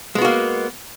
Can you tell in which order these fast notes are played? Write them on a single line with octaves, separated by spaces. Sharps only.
G#3 B3 F#4 A#3